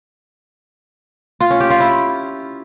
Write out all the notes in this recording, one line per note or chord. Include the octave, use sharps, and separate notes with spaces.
F4
C#4
G4
F4
E4